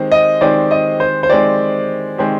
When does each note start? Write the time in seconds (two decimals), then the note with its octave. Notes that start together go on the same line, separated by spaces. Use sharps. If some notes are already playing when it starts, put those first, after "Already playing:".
Already playing: D#3 G#3 C4 G4
0.12 D#5
0.41 D#3 G#3 C4 G4 D5
0.71 D#5
1.00 C5
1.23 C5
1.29 D#3 G#3 C4 G4 D5
2.18 D#3 G#3 C4 G4